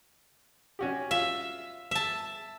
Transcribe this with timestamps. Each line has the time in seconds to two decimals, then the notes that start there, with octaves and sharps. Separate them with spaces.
0.79 C#4 F#4 G4
1.11 F4 E5 F5
1.91 E5 A5